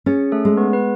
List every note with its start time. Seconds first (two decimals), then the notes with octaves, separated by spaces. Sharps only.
0.06 C#4 G#4
0.32 A3 A4
0.45 G#3
0.57 B3 B4
0.73 B4